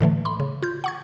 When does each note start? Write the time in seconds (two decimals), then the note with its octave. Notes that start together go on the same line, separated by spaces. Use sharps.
0.01 A2 D3 E3 A3
0.25 B5 C6
0.40 C#3
0.62 F4 G6
0.84 F#5 C#6 G#6